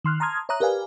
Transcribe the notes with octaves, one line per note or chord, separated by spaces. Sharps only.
D#3 C6 F6 F#6
A5 A#5 C6 D#6 F6 G#6
C#5 E5 A#5 D#6 F#6
G4 A#4 B4 D5 F5 G#5